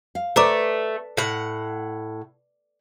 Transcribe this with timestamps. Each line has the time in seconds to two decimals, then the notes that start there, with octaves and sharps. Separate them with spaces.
0.15 F5
0.36 A3 A4 B4 C5 D5 A#5 D6
1.17 A2 F#5